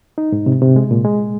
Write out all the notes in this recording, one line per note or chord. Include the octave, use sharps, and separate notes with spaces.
D#4
G#2
C3
C3
G#3
A#2
G#3